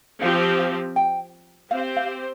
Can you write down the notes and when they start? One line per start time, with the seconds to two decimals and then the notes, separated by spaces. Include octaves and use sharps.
0.22 F3 C4 G4 F5
0.59 F5
0.96 G5
1.71 C4 G4 C5 F5
1.97 F5